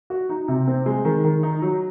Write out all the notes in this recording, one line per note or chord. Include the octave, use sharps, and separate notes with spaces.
F#4
D#4
C3
C4
G#3
D#3
D#3
D#4
F#3